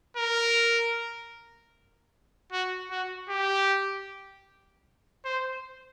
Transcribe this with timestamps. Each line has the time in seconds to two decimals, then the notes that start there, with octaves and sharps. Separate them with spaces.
0.17 A#4
2.52 F#4
2.91 F#4
3.29 G4
5.25 C5